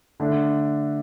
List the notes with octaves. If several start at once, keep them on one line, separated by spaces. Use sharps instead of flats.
D3 A3 D4